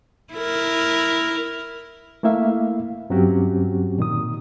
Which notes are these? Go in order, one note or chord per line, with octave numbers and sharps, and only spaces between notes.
E4 A#4
A3 A#3 E4 E5 F5
G2 F#3 C4 C#4 F#4 G4
A#2 D#3 D#6